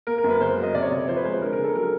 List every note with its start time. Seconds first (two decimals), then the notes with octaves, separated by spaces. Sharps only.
0.07 A#3 A#4
0.18 A#4
0.24 F#2
0.29 B4
0.41 C#3 C5
0.58 F#3
0.63 D#5
0.74 C3 D5
0.82 C#5
0.91 C3 D5
1.00 C#5
1.08 F3 C5
1.16 B4
1.25 G#3 C5
1.42 D4 A#4
1.53 A#4
1.58 C#3
1.64 A4
1.75 F#3 A#4